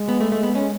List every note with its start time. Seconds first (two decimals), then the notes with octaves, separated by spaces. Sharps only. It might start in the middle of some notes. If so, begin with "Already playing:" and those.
Already playing: G#3
0.09 B3
0.20 A3
0.32 A3
0.43 B3
0.55 C#4